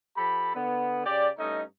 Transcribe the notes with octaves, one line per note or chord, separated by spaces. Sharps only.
F3 G4 A4 B5
D3 B3
C#3 G4 D5
G2 A3 C#4 D#4 D#5